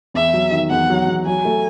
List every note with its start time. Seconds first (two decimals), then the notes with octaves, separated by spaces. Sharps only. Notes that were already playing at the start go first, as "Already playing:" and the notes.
0.14 E2 E5
0.34 F#3
0.52 D#3
0.70 E2 F#5
0.90 F#3
1.08 E2
1.26 F#3 G#5
1.45 A3